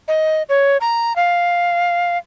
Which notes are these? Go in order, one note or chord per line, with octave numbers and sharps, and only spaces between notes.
D#5
C#5
A#5
F5